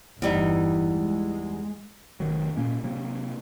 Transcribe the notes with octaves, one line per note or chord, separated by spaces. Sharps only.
G1 E2 E3 G3 D#4
G#3
F1 D#3 F#3
A#2 A#3 C#4
C3 F#3 A#3 C4